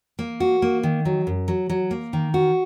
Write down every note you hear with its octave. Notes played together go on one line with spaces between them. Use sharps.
A#3
F#4
A#3
D#3
F#3
F#2
F#3
F#3
A#3
D#3
F#4